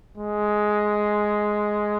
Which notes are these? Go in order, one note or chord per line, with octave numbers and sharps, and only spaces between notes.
G#3